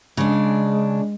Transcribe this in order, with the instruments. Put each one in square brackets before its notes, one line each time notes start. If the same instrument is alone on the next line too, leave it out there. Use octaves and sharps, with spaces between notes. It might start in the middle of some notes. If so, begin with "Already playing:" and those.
[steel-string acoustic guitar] C#3 D4 [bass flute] G#3